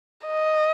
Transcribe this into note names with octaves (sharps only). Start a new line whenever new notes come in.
D#5